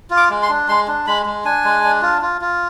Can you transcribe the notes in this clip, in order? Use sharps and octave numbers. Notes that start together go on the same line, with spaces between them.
F4
D6
G#3
C6
D4
G#3 C6
D4
G#3 B5
G#3
D4 G#5
G#3
D4
F4
F4
F4